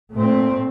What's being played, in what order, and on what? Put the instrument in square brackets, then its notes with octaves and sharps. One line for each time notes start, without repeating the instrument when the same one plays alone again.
[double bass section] A#2 A3 C4